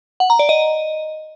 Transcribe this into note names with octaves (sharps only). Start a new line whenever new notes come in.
F#5
A#5
D5
D#5